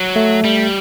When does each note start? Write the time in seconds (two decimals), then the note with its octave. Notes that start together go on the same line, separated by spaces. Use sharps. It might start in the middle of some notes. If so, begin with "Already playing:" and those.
Already playing: F#3
0.16 A3
0.44 G3